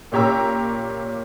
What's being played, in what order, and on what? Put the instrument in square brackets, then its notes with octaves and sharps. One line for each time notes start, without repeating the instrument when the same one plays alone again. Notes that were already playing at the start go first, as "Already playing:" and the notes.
[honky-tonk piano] A#2 C#4 G4 C#5 A#5 E6